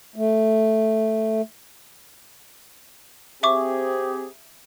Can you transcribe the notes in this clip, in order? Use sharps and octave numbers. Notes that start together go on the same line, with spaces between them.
A3
C4 G4 G#4 E5 C#6 D6